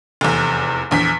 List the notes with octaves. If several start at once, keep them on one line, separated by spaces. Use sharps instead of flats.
F1 E2
A#1 E2 B6